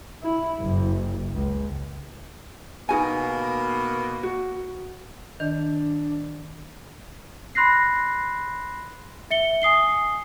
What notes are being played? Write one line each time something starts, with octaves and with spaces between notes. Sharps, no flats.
E4
F#1
C#2
B2 A#3 D#4 F#4 G#5
F#4
D#3 D4
B5 C6 F#6 A#6 C7
E5 C#7 G7
G#5 D#6 C7 G7